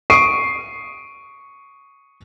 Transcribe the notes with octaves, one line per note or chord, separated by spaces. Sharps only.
C#6 D#6 C7 D7 D#7